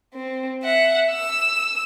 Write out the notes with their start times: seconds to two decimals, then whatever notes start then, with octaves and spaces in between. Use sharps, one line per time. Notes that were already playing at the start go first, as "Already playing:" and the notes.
0.14 C4
0.63 E5 F#5
1.11 E6